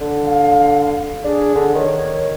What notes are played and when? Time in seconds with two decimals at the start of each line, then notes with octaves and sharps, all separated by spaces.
0.01 D3
0.25 F5
1.24 D4 G#4
1.55 D3
1.75 D#3 C#5